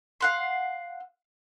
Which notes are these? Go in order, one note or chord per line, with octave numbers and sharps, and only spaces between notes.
F5 F#5 C6